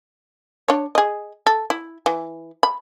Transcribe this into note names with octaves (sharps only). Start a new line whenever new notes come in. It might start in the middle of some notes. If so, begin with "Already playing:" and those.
D4 C#5
G#4 D#5
A4
E4
E3
B5